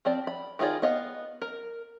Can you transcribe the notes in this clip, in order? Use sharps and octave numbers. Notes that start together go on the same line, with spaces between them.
F3 C4 D5
B5
D#3 D#4 F4 G#4 D5
B3 D#5 F5
A#4